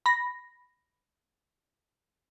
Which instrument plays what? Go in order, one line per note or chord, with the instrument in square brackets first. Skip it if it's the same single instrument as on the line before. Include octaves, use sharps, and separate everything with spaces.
[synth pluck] B5 A#6